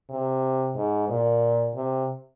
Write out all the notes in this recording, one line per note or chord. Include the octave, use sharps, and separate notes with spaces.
C3
G#2
A#2
C3